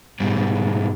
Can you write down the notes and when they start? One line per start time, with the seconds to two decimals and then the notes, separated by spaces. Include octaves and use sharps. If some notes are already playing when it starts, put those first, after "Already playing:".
0.20 G#2 B2 G3